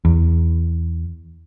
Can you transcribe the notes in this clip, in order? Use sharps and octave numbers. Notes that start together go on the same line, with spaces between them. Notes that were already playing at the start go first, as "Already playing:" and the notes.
E2